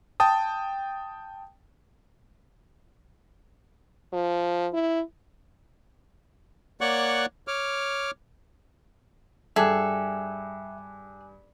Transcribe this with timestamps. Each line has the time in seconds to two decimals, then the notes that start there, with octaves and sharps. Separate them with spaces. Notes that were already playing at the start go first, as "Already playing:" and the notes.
0.20 G5 A5 D#6
4.13 F3
4.73 E4
6.81 A#3 C#5 D5 F#5 C#6 F#6
7.48 C#5 D6 F6
9.56 G2 G#4 A4 E5 G5 G#5 D6 F#6